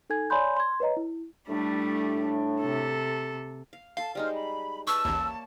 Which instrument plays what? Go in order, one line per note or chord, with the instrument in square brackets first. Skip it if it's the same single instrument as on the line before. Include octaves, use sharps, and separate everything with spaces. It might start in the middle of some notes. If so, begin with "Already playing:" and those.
[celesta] D#4 A4 G#5 G#6
C#5 D5 G#5 B5 C6 G6
C6 G#6
B4 C#5 D#5 A#5
E4
[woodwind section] A2 D4 [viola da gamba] G3 A3 G4
[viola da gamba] C3 A4
[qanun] F5
[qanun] A4 C6 [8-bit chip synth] F5 [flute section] A5
[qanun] G3 G#3 D#4 [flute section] C5 F6
[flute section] B5
[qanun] B4 [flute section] A5 [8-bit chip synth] C#6 [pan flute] E6
[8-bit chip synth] A1 D#2 [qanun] A#3 C#5 E5